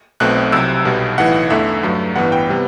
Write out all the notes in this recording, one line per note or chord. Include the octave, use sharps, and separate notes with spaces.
B1 B2 A3 C4 F#6
C2 C3 F#3 E6
B1 B2 G3
B1 A2 E3 F#5
E2 D3 A3 E5
G2 F#3 A3
A1 G2 E3 B3 F#5
G5
C3 G3 B3